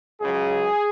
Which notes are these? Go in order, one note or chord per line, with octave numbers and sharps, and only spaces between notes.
C#2 C#3 F#3 G#4